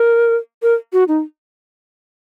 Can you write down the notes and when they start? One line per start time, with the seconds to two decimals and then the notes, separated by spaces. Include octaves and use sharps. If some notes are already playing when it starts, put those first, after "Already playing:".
Already playing: A#4
0.63 A#4
0.93 F#4
1.08 D#4